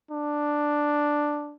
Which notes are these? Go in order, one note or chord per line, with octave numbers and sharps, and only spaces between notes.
D4